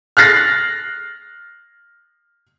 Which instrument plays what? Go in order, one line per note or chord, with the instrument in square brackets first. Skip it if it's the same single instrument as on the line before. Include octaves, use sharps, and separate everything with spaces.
[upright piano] F6 F#6 A6 A#6 C7